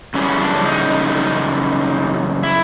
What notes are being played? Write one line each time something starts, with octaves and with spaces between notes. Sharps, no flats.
F#2 C#3 E3 G3 C#4
D4
D#4
E4